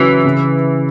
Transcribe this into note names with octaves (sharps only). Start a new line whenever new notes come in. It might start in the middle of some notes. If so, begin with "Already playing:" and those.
Already playing: C#3 E3 F#3 C#4 F#4
C#3